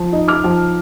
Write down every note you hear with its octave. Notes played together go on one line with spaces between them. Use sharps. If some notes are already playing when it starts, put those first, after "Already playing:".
Already playing: F3
D#4
D6 F6
F3